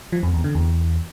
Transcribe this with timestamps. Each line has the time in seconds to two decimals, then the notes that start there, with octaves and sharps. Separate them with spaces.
0.13 F3
0.23 F2
0.34 E2
0.44 D3
0.55 E2